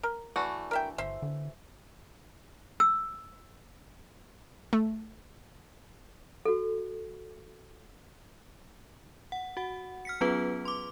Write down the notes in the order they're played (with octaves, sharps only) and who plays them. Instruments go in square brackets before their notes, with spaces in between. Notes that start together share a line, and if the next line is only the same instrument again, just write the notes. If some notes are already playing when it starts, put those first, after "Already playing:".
[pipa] A#4
[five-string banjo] E3 A3 F#4 [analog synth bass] D4
[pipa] A#4 E5 G5
[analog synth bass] G1 [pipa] C5 E5
[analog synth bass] D3
[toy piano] E6
[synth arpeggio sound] A3
[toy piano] F#4 A4
[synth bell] F#5
F#4 F#5
F6 B6 C#7
F#3 B3 C#4 F4 G#4 B4
C6 D6